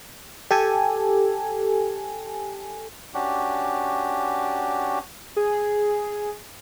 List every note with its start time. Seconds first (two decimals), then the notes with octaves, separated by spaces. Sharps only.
0.51 G4 A4 G#5
3.14 C#4 D4 F#4 G4
5.36 G#4